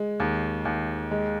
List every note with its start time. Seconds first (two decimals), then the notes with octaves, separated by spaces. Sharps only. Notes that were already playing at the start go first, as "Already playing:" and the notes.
Already playing: G#3
0.20 D#2
0.65 D#2
1.11 G#3